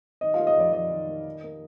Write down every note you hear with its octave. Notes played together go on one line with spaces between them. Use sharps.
D#3 D#5
F4 F5
A#3
D#5
F2 D5
F2 D#5
D#3
A#3
D#3
A#3